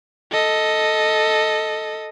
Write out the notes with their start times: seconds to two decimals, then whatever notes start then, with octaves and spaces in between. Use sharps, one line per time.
0.31 A4 D#5